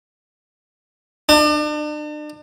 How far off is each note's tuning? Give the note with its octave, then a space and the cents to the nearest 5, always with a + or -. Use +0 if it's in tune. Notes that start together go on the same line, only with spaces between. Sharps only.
D4 +40